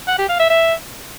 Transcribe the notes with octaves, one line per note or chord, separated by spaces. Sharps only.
F#5
G4
F5
E5
E5